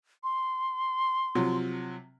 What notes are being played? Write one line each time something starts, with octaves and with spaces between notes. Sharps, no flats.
C6
C3 F3 F#3